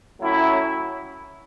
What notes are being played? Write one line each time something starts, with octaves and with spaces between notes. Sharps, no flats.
A2 F#3 C#4 E4